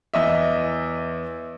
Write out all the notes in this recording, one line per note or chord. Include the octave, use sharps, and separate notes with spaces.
E2 D#5 E5